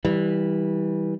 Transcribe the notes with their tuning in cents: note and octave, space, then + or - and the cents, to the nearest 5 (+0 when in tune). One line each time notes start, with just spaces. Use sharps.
E3 -20 G3 +0